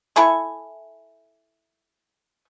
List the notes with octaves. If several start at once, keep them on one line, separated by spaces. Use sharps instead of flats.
E4 A4 G#5 C#6